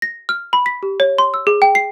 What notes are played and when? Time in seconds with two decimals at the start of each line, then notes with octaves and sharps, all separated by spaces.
0.02 A#6
0.29 F6
0.53 B5
0.66 B6
0.83 G4
1.00 C#5
1.18 C6
1.34 E6
1.47 G#4
1.62 G5
1.75 C7